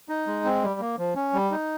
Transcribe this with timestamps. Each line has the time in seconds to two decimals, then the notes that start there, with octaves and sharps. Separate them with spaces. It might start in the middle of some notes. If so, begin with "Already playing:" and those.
0.09 D#4
0.27 G#3
0.45 C4
0.62 G3
0.80 A#3
0.98 F3
1.15 C#4
1.33 G3
1.51 D#4